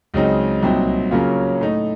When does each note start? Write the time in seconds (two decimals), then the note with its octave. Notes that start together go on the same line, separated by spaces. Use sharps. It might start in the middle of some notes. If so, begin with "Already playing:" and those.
0.14 C#2 C#3 F#3 C4 D#4
0.62 C2 A#2 F#3 C4 D#4
1.11 C#3 F#3 A#3 C#4 F4
1.60 A2 A3 D#4